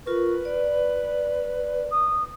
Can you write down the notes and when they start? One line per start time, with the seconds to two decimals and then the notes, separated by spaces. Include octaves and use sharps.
0.06 F4 A#4 B4 C#6
0.45 D5
1.91 D#6